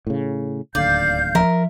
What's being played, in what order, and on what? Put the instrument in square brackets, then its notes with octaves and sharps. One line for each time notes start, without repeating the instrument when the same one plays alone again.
[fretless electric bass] A2 C#3
[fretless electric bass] D1 D#2 D3 [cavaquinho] D5 [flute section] F5 G6
[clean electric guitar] F3 E5 [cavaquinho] A#4